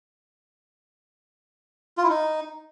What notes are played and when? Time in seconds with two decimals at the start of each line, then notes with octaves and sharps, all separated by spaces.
1.98 F4
2.04 E4
2.09 D#4